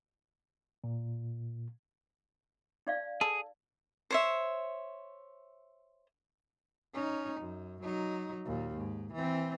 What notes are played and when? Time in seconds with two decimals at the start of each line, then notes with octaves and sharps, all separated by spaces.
0.84 A#2
2.87 D#4 D5 F5
3.21 G#4 A4
4.11 C5 C#5 E5
6.94 C#4 D#4
7.41 F#2
7.83 F#3 D#4
8.45 D#2 A#2
8.77 G#2
9.14 E3 C4